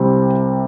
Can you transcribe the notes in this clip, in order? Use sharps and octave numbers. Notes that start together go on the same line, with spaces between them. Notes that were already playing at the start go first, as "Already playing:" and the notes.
Already playing: C2 C3 G3 C4